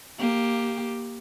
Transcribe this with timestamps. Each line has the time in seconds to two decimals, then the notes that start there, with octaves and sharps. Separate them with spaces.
0.18 A#3 G4